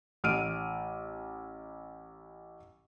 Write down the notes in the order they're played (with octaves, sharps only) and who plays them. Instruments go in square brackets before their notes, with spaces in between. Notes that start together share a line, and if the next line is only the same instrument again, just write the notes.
[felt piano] A1 F6 D7 D#7